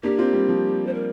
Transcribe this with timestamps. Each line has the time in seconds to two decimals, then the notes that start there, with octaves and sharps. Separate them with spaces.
0.03 A#3 D4 G4
0.18 C4 F4
0.33 G3
0.49 F3
0.87 C5
0.94 A#4